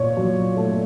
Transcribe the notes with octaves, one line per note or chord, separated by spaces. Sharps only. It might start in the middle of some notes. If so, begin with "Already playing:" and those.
Already playing: A#2 C#5 D5
F#3
A3